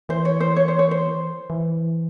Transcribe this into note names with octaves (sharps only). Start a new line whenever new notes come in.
E3 C5
C#5
C5
C#5
C5
C#5
C5
E3